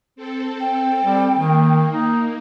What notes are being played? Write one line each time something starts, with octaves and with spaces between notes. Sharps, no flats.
C4 A4
G5
G3
D#3 A#3
D#4